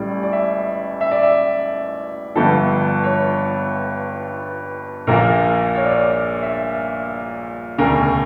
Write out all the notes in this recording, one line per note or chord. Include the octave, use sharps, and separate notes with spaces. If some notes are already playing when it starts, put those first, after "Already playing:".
Already playing: A1 A2 G3 D5
D5
E5
E5
D5
E5
G1 G2 D3 F3 A4
C#5
A#1 A#2 F3 A#3 A#4
C#5
D5
C#5
E5
E1 D2 C#3 A#4